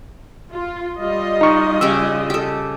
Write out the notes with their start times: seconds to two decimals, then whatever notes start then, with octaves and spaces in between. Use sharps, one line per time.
0.52 F4
1.00 G3 F4 D#5
1.41 D#4 C#6
1.81 C#3 C#4 G4 E6
2.30 G4 A4